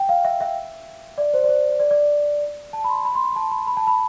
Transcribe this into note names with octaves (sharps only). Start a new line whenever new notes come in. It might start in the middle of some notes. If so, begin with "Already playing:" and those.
Already playing: G5
F5
E5
E5
D5
C5
D5
C5
D5
D5
A5
B5
C6
B5
C6
B5
A5
B5
B5
A5
B5